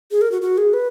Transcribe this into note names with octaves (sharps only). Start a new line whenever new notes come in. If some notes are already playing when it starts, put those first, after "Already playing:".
G#4
A#4
F#4
F#4
G#4
B4